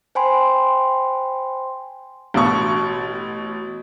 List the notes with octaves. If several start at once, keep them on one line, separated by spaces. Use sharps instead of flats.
C5 G5 G#5 B5 C6
A1 B2 C#6